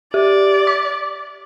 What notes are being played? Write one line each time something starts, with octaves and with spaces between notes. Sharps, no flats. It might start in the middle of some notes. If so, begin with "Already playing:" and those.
G4 D5
D6